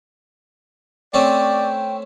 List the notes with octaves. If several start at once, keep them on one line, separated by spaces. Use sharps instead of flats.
A3 C4 C#4 D5 G5